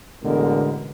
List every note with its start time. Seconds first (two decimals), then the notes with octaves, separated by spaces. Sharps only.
0.24 A1 B2 D3 G#3 B3 A#4